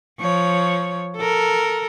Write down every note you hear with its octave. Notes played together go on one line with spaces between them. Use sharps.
F3 C#5
A4 A#4